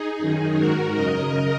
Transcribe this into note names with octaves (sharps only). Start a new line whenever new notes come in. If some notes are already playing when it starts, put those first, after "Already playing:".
Already playing: D#4 G#4
F#2 D#3
G#2 D#3 F#4 A#4
F#2 C#3 A#4 D#5